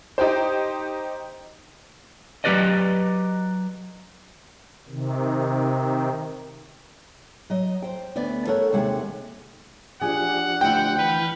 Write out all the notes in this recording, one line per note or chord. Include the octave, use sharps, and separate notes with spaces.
D#4 G4 C5
F#3 G#3 G4 B4 D5 D#5
C3 D#3
F#3 D#5
C5 G5
D2 B3 D5
A4 A#4 C#5 F#5
D#2 C3 G#3 F#5
F3 D4 G4 G#4 F#5
D2 E4 G5
E3 B4 F6 G6